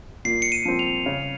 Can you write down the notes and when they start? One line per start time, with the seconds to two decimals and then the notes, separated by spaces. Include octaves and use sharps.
0.25 A#2 C7
0.42 C#7
0.52 D#7
0.65 F3 C4
0.79 F7
1.06 C#3